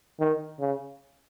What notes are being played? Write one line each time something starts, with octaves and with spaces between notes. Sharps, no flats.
D#3
C#3